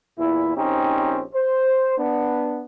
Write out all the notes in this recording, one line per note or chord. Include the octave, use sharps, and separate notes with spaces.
E2 A#2 E4
A#1 C4 C#4 D#4 G4
C5
B3 D4